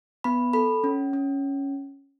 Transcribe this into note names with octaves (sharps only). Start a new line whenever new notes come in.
B3 B5
A4 B5
C#4
C#4